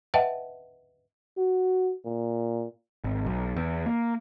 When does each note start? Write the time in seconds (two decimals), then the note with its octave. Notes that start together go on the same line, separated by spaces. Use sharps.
0.14 B4 D#5 E5 F#5 G5 A5
1.37 F#4
2.06 A#2
3.04 G#1
3.26 B1
3.56 E2
3.86 A#3